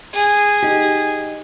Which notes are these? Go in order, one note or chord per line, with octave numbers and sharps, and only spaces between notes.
G#4
D#4 G4